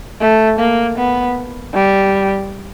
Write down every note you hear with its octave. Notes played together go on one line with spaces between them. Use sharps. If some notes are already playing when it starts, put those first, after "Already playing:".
A3
A#3
B3
G3